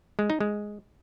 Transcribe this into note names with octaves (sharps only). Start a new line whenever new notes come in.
G#3
D#4
G#3